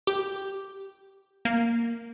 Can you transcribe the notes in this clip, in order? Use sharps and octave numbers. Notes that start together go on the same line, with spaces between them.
G4
A#3